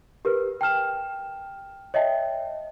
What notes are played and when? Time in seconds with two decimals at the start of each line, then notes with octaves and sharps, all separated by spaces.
0.25 G4 A#4 B4
0.61 G5 A5 F6 E7
1.94 C#5 D#5 E5 G5 A5